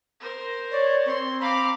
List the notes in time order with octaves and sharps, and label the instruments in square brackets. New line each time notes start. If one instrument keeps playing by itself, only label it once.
[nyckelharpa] A#4 C5
[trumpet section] C#5 [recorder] D5
[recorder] C4 [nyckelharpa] C6
[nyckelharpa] F5 D6 [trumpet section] A#5 B5